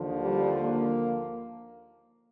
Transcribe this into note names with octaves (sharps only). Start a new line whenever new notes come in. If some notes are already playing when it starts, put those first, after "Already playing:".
Already playing: D#2 D3 F3
G3
A#3